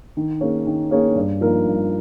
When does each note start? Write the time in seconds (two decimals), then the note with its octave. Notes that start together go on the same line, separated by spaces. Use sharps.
0.17 D#3
0.41 A#3 C#4 G#4 C#5
0.67 D#3
0.91 A#3 C#4 G#4 C#5
1.15 G2
1.41 F3 A#3 D#4 A#4
1.66 G2